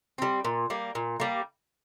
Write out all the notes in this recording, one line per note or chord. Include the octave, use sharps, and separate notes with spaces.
G3 C4
A#2
G3 A#3
A#2
G3 A#3